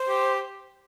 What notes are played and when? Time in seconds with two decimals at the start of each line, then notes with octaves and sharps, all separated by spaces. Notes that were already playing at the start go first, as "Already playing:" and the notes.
Already playing: C5
0.08 G4